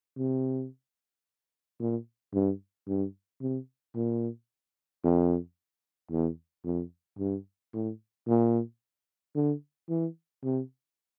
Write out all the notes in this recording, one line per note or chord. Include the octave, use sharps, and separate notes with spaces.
C3
A#2
G2
G2
C3
A#2
F2
E2
F2
G2
A2
A#2
D3
E3
C3